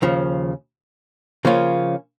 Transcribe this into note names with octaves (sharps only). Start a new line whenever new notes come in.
D#2 C#3 F3
C#3 F3 A#3 C#4 F4